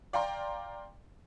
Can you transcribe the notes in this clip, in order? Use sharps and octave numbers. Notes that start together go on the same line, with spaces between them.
D5 F5 G5 A#5 C6